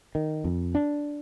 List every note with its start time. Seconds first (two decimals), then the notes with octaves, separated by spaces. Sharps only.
0.15 D#3
0.44 F2
0.75 D4